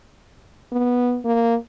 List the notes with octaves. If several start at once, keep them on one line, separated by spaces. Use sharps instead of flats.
B3
A#3